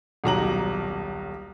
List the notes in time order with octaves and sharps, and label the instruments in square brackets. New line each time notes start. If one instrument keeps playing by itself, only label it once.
[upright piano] D#1 B1 A#5 F#7